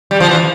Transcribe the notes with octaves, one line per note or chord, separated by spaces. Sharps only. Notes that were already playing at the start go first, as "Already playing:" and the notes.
G3
F3
E3